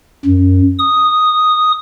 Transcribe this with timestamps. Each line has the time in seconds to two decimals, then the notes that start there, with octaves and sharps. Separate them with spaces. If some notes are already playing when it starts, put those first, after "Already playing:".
0.25 F#2
0.78 D#6